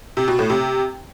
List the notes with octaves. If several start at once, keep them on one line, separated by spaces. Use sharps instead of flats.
C3
B2
A2
C3